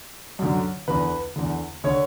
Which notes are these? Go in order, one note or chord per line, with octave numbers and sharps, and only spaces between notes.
F#2 D3
E2 D3 B4
E2 D3
D3 C#5